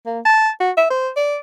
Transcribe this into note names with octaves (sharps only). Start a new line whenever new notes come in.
A#3
A5
F#4
E5
C5
D5